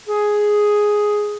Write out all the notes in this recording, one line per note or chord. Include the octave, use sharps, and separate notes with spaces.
G#4